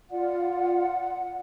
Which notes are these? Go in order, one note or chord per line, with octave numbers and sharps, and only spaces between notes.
F4 D5 F#5